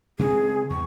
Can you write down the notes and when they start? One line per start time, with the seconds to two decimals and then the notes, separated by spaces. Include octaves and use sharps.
0.19 C#3 G#3 C4 G#4
0.70 E2 C#6